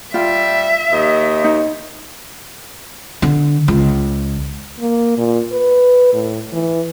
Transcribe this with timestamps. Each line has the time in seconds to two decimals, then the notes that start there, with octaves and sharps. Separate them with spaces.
0.14 G3 F4 E5
0.92 D#2 D#5
1.44 D#4
3.22 D3
3.68 C#2
4.80 A#3
5.18 A#2
5.52 B4
6.13 A2
6.52 E3